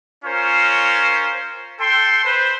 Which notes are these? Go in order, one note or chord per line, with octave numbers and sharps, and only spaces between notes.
C#4 F4 A#4 C5 C#5
A4 G5 C6
B4 C5